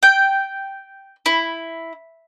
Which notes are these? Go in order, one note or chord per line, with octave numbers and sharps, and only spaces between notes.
G5
E4